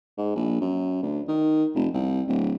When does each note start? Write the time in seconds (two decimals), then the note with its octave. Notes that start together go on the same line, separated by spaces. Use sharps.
0.18 G#2
0.36 A#1
0.61 F#2
1.03 D2
1.28 D#3
1.75 F1
1.94 C2
2.27 D1